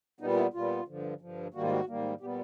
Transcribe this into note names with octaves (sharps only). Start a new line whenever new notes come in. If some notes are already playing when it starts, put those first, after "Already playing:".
A#2 G3 B3 D#4
E4
A#2 G3 B3 F4
G2 D3 F3
G2 D3 F3
G#2 D#3 G3 A#3 F#4
F4
F#4
G#2 D#3 G3 A#3
A#2 G3 B3 G4